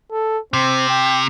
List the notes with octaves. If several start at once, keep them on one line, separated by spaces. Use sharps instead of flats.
A4
C3 C4
G5